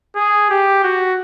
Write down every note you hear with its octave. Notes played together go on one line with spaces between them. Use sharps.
G#4
G4
F#4